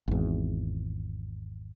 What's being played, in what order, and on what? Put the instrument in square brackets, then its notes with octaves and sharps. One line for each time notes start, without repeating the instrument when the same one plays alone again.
[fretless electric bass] G#1 E2